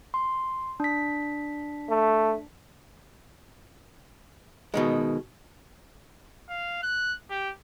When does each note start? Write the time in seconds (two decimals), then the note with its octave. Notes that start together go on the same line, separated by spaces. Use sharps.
0.14 C6
0.80 D4 B6
1.90 A3
4.74 B2 D#3 G#3
6.49 F5
6.83 F#6
7.30 G4